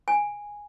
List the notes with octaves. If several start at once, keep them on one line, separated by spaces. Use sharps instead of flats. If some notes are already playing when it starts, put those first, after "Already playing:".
G#5